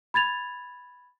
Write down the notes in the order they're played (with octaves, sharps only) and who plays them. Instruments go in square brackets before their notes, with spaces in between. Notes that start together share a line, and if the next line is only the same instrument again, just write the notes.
[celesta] B5 G#6 A6 F7